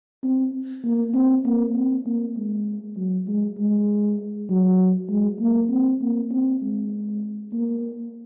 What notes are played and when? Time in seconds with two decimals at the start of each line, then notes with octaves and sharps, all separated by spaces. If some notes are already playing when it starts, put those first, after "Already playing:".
0.23 C4
0.84 A#3
1.14 C4
1.45 A#3
1.75 C4
2.06 A#3
2.37 G#3
2.97 F#3
3.28 G#3
3.58 G#3
4.50 F#3
5.09 G#3
5.40 A#3
5.70 C4
6.02 A#3
6.31 C4
6.62 G#3
7.53 A#3